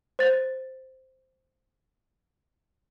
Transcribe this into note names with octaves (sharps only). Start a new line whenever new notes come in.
C5 A6